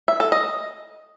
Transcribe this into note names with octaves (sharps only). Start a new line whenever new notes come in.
E5
A4
D#5